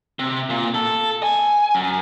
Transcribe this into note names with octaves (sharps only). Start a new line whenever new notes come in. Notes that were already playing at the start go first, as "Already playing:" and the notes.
C3
A#2
A4
G#5
F#2